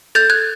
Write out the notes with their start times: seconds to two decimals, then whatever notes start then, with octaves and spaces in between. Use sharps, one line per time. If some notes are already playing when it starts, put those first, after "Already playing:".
0.15 A4 G6 A6
0.30 F#6 G#6